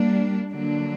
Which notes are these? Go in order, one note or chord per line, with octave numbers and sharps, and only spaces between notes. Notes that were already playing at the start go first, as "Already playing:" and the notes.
Already playing: G3 A#3 D4
D3 F#3 A#3 D4